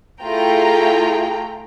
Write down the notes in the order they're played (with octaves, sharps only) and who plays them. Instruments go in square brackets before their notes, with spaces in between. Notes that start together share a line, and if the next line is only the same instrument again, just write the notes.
[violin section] A3 E4 F4 G#4 G5 A#5